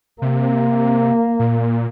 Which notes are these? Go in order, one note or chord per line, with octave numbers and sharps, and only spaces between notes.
C3 A#3
A#2